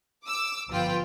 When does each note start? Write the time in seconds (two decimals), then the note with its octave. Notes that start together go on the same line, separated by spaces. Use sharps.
0.25 D6 E6
0.69 G1 F3 F4 B4 G5